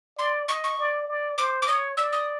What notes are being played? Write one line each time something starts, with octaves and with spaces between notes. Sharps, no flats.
D5 C6
D#5 C#6
C#6
D5
D5
C5 D6
D6
C#5 D#6
D5 E6
D#6